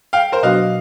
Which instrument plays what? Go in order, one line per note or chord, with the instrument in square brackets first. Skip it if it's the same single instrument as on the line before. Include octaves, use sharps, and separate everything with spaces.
[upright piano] F5 G5
A#4 C5
[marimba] B2 F#3 B3 D4 F#4 [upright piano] D#5 F5